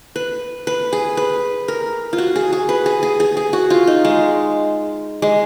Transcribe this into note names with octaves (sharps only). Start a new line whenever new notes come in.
B4
B4
G#4
B4
A#4
F4
F#4
G#4
G#4
B4
G#4
G#4
G#4
G#4
F#4
F4
D#4
G#3
G#3